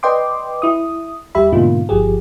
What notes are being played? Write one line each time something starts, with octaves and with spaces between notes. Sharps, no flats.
B4 D5 D#5 G5 C6 D6
E4 D#6
D#2 G3 G4 E5 B5
G#2 B2 D3 A#3 D#4 F4
G1 F3 G4 G#4